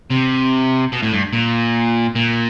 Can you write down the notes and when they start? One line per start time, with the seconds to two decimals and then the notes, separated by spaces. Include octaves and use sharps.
0.10 C3
0.92 B2
1.03 A2
1.13 G2
1.33 A#2
2.16 A#2